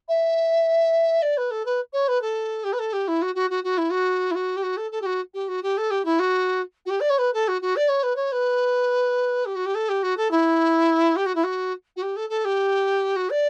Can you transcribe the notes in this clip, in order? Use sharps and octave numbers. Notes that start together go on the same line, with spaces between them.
E5
D5
B4
A4
B4
C#5
B4
A4
G4
B4
A4
G4
E4
F#4
F#4
F#4
F#4
E4
F#4
E4
F#4
G4
F#4
A4
A4
G4
F#4
G4
F#4
G4
A4
G4
E4
F#4
F#4
G4
D5
C#5
B4
A4
F#4
F#4
D5
C#5
B4
C#5
B4
G4
F#4
G4
A4
G4
F#4
A4
E4
G4
F#4
E4
F#4
F#4
G4
A4
A4
G4
F#4
D5